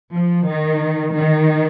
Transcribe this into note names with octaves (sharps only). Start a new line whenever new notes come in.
F3
D#3
D#3